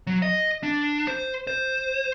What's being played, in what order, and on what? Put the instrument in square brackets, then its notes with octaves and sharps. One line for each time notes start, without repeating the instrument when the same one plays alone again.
[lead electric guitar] F#3
D#5
D4
C5
C5